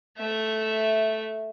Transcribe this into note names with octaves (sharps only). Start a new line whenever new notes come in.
A3 E5